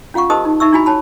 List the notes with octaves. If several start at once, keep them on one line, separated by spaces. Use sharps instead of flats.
C#4 F4 F5 F#5 C#6
G4 A#4 C5 D#5 A5 D#6
D#4
D#4 E5 C#6 E6
D4 E4 F#4 G#5 B5
C#5 A5 B5